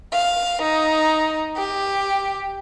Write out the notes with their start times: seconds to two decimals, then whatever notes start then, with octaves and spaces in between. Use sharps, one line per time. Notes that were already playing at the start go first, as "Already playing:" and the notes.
0.12 F5
0.62 D#4
1.56 G4